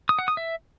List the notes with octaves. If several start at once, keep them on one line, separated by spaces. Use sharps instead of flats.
D#6
F#5
D#6
E5